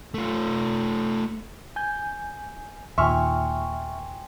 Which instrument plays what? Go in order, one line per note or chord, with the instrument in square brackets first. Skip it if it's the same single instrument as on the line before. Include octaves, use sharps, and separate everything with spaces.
[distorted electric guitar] A3 F4
[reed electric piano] G#5 G6
[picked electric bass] D#2 A#2 [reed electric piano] E5 F6 [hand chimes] G5 G#5 C6 [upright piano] C#6